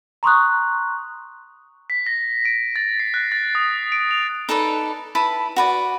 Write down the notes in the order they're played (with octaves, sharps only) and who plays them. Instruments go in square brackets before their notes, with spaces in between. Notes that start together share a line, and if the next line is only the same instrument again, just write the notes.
[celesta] A#5 C6 C#6 D#6 F#6
[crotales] B6
A#6
D7
A6
C7
F#6
A6
D#6
D7
F7
[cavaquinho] D#4 A4 B4 D5
E4 B4 A5 B5
F#4 B4 D5